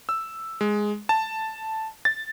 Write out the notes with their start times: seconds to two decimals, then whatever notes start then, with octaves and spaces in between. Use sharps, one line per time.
0.09 E6
0.61 G#3
1.09 A5
2.05 A6